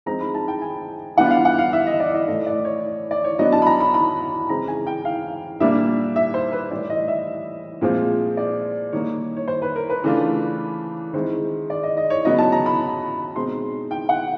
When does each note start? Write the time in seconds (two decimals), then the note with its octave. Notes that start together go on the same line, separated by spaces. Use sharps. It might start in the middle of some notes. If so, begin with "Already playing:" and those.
0.06 F3 G#3 C4 D#4 A#5
0.20 B5
0.34 A5
0.48 G5
0.62 G#5
1.17 E3 G3 B3 D4 F4 F#5
1.31 F5
1.45 F#5
1.58 F5
1.73 E5
1.87 D#5
2.00 D5
2.14 D#5
2.28 A2 E3 A3 D#5
2.47 D5
2.65 C#5
3.11 D5
3.24 C#5
3.39 F#3 B3 D4 D#5
3.52 A5
3.62 B5
3.66 A#5
3.80 B5
3.94 B5
4.49 C#3 E3 G#3 C4 A#5
4.68 G#5
4.87 G5
5.05 F5
5.60 A#2 G3 A#3 D4 E5
6.16 E5
6.34 C5
6.52 B4
6.71 A2 E3 G3 D5
6.90 D#5
7.08 E5
7.81 A#2 F3 G#3 C4 F4
8.37 D5
8.92 D#3 G3 A#3 D#4 C#5
9.36 C#5
9.48 C5
9.62 B4
9.76 A#4
9.90 B4
10.03 C#3 E3 A3 D4 F4
11.13 D#3 G#3 C4 E4 C5
11.70 D5
11.83 D#5
11.97 D#5
12.10 C#5
12.25 C#3 F#3 B3 D#5
12.39 A5
12.52 A#5
12.66 B5
13.36 B2 G#3 C4 D#4 C6
13.91 G5
14.09 F#5